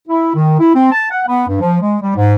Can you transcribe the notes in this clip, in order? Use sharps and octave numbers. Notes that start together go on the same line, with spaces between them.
E4
D#3
E4
C4
A5
F#5
B3
G2
F3
G#3
G3
G#2